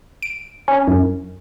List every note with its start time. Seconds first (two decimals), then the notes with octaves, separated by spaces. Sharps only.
0.22 D7
0.68 C#4
0.88 F#2